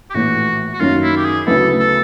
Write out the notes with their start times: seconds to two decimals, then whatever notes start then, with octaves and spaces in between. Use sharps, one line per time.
0.10 G4
0.14 A#1 A2 E3 F#4
0.73 F#4
0.80 F#2 D#3 F#3 A#3 C#4 F4
1.03 E4
1.17 G4
1.25 G#4
1.46 D2 C#3 F#3 B3 E4 A4
1.79 A4